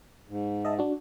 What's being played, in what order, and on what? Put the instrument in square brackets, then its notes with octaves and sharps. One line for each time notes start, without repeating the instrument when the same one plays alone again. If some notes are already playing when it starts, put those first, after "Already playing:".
[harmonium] G#2
[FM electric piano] D#5 E5 A5
D4 F#4